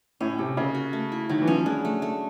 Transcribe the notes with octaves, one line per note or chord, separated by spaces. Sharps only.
A2 C#4
C3 A4
C#3 A#3
F#4
A3
E4
D#3 F#3
E3
F3 C#4
G#3 D4
A3
A3